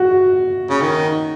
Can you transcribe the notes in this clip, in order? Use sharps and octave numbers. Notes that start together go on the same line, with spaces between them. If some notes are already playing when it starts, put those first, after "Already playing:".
Already playing: F#4
C#3
D#3